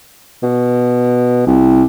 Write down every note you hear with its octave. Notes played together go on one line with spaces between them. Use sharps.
B2
C2